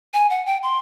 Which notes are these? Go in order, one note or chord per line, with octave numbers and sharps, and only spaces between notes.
G#5
F#5
G5
C6